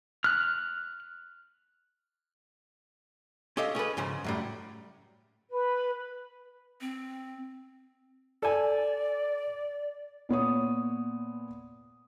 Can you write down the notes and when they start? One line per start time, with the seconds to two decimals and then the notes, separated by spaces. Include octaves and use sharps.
0.24 F6 F#6
3.57 C#4 G4 A4 D#5 F5
3.75 C#4 G#4 A4 B4
3.97 G#2 C#3 F3 C5
4.24 F#2 A2 G3
5.51 B4
6.81 C4
8.42 A4 D5 G#5
10.29 A#2 B3 C#5 D#6